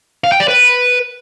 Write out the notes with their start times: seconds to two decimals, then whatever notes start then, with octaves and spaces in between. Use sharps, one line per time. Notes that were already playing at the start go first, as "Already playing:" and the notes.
0.24 F5
0.32 G5
0.40 D5
0.48 B4